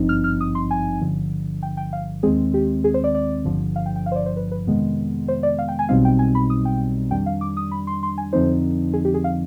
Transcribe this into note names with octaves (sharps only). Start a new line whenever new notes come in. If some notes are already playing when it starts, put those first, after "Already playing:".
Already playing: G#1 G2 F3 C4 D#4
F6
F6
D#6
C6
G#5
G1 G2 D3 F3
G5
G5
F5
D#2 D#3 G#3 C4 G#4
G4
G#4
C5
D5
D5
G1 G2 D3 F3
F5
G5
G5
F5
C5
D5
C5
B4
B4
F2 C3 D#3 G#3 B3
C5
D5
F5
G5
G#5
B1 B2 G3 C4 D#4 F5
G5
G#5
B5
D#6
G5
F2 D#3 G3 D4 G5
F5
D6
D#6
B5
C6
C6
G#5
F2 D3 F3 C4 D#4 C5
G#4
G4
G#4
F5